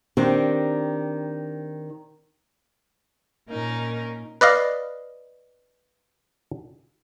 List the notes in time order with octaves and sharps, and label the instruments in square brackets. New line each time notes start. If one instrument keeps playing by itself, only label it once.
[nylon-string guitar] D#3 C4 D4 G4
[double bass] A#2 A#3 [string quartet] C#4 D#4 A#4
[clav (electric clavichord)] B4 D5 D#5 F5